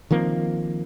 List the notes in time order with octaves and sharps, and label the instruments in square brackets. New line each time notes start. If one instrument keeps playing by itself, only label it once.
[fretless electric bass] D#3 F3 A#3 C4